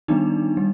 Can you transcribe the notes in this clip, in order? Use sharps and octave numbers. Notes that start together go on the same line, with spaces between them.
D#3 G3 B3 D4 D#4
G3